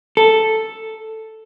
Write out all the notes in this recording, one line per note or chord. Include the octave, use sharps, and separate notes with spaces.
A4